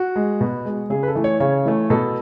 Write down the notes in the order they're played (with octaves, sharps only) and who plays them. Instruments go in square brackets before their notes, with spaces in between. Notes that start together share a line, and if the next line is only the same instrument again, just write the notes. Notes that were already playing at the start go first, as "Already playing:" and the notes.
Already playing: [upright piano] F#4
G#3
B2
G#3
C#3 G#4
B4
A4
E3 A3
C#5
C#3 C#5
E3 A3
B2 A4